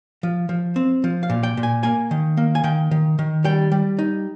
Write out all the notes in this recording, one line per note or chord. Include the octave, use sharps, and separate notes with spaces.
F3
F3
C4
F3
F5
A#2
G5
A#2
G#5
A#3 G#5
D#3
A#3
G#5
D#3 G5
D#3
D#3
G3 G5
G3
D#4